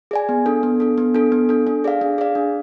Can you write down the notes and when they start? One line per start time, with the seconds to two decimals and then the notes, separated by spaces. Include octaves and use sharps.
0.11 G#4 D5 G#5
0.29 B3
0.46 D4 A4
0.63 B3
0.80 D4 A4
0.98 B3
1.15 D4 A4
1.32 B3
1.49 D4 A4
1.67 D4
1.84 G#4 D5 F5
2.01 D4
2.18 G#4 D5 F5
2.35 D4